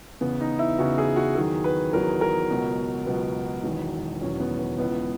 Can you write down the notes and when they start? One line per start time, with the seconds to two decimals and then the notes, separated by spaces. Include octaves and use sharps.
0.21 E2 C#3 E3 B3
0.41 D#4
0.59 E4
0.78 E2 C#3 E3 F#4
0.98 G#4
1.16 F#4
1.35 E2 D#3 F#3 G#4
1.64 B4
1.93 E2 D#3 F#3 A#4
2.21 A#4
2.50 C#2 B2 F#3
3.06 C#2 B2 F#3 B3
3.64 E1 E2 D#3 F#3
4.21 E1 E2 D#3 F#3 C#4
4.40 B3
4.59 B3
4.78 C#2 C#3 E3 B3